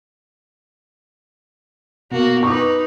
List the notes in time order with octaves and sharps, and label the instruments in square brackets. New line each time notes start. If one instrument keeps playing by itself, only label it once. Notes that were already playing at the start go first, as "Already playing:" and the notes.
[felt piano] B2 [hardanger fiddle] A#3 F#4
[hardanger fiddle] D#4 B4 [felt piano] C#6 D6